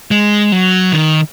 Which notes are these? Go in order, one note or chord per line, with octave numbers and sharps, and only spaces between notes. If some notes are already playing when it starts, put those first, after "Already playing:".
G#3
F#3
D#3